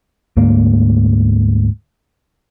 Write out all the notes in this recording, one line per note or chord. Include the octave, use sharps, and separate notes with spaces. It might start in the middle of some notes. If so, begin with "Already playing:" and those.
D2 G#2 A#3